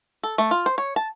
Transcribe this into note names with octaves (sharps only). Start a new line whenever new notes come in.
A4
A3
F4
C5
C#5
A5